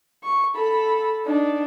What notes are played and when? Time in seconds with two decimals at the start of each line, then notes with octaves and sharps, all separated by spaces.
0.24 C#6
0.55 A4 B5
1.25 D4 D#4